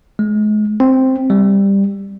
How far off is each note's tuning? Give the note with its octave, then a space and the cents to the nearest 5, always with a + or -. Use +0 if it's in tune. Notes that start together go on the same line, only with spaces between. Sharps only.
G#3 +35
C4 +0
G3 +10